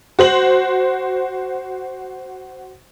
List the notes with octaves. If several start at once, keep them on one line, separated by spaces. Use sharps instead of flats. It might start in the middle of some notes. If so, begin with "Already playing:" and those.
F#4 C5 F#7